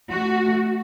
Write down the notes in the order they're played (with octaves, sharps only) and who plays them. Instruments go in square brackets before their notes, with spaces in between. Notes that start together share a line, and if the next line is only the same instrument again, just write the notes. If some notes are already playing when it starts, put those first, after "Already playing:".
[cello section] A3 F#4